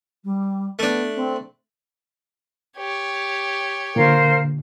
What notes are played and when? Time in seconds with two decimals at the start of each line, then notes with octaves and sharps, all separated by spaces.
0.24 G3
0.79 A3 B3 D4
1.15 C4
2.77 G4 C#5
3.96 A#2 D3 A#4 C5 F5